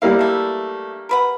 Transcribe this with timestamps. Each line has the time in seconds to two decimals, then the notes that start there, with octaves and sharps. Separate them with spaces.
0.02 G3 A#3 E4 F5
0.19 A3 D4
1.09 A#4 B4 F#5